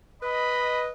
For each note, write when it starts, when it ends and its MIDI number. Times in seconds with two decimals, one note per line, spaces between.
0.22 0.90 71
0.22 0.92 75
0.22 0.82 83